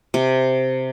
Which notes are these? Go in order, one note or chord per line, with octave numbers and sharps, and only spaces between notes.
C3